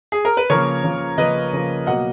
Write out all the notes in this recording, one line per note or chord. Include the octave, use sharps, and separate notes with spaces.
G#4
A#4
B4
C#3 F3 A#3 A#4 C#5
C#3 F3 A#3
C#3 F3 A#3 B4 D#5
C#3 F3 A#3
B2 F#3 A#3 D#5 F#5